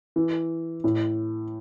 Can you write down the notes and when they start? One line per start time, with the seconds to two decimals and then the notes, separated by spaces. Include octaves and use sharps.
0.16 E3
0.84 A2